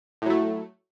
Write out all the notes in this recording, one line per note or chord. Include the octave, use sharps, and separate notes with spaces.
A2 F#3 A3